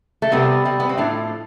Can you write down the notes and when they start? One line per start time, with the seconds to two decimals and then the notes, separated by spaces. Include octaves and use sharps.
0.22 A3
0.32 C3 G3 B3
0.65 C3 G3
0.80 B3
0.89 C4
0.97 A2 F3 A3 D4